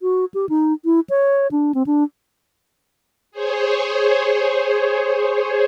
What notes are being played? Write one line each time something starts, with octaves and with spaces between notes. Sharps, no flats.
F#4
G4
D#4
E4
C#5
D4
C4
D4
G#4 C5 C#5